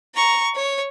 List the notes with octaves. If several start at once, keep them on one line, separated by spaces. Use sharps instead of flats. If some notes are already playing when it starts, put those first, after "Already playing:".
A#5 C#6
C#5